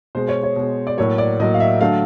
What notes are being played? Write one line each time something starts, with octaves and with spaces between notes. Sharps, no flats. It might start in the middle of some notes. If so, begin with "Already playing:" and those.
B2 G#3 C5
C#5
C#5
B2 G#3
D5
A2 F#3 A#3 C#5
D5
A2 F#3 A#3 D#5
F5
E5
D3 F#3 A3 F5